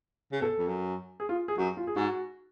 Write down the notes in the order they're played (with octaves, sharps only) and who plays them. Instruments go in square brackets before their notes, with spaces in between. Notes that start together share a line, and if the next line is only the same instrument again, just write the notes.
[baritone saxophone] C#3
[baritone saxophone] B2 [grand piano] A4
[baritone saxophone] F2
F#2
[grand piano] G#4
F4
G#4
[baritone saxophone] F#2 [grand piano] F#4
[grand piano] F4
G#4
[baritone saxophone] G#2 [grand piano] F#4